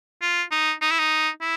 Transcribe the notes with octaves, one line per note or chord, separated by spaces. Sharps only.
F4
D#4
D#4
E4
D#4
E4